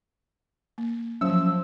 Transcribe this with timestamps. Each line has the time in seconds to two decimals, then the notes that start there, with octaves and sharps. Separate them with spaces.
0.78 A#3
1.21 F3 F#3 C#4 E6